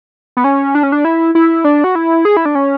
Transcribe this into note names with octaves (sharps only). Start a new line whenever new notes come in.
B3
C#4
D4
C#4
D4
E4
E4
D4
F#4
E4
G#4
E4
D4
C#4